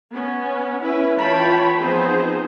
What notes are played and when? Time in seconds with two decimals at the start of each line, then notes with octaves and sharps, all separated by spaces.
0.11 B3 C#4
0.82 C#4 E4 B4
1.18 E3 F4 C#5 G5 A5 B5
1.78 F3 B3 C4 D#4 G#4 C5